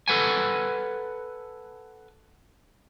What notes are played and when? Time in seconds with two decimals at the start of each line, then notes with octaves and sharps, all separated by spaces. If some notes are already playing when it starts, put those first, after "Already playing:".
0.08 A4 B4 F#5 G#5